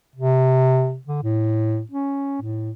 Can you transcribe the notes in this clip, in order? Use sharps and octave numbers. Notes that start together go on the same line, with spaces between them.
C3
D3
A2
C#4
A2